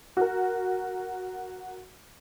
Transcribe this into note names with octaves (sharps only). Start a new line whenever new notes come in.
F#4 A#4